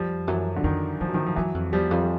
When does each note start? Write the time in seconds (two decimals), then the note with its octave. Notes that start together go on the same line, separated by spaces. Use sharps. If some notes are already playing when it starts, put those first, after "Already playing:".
Already playing: F2 F3 G3
0.27 F#2 E3 F#3
0.56 D3
0.64 F2 D#3
1.01 G2 F3
1.08 F#3
1.14 D#3 F3
1.26 F3
1.36 F#2 E3 F#3
1.54 F2
1.73 E2 F3 G3
1.91 F2
2.02 G3